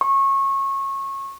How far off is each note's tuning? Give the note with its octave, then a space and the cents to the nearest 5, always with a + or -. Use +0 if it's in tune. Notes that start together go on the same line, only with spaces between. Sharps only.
C#6 -25